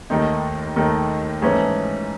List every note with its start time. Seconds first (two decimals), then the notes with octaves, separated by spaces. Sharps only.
0.10 D#2 D#3 A3 D#4
0.76 D#2 D#3 A3 D#4
1.42 G#2 E3 A3 C#4 G#4